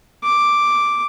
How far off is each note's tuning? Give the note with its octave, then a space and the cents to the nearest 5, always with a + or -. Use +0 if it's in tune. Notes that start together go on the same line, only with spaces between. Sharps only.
D6 +0